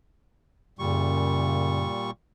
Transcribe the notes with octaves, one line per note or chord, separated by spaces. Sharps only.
F#2 A#2 C#3 G3 C#6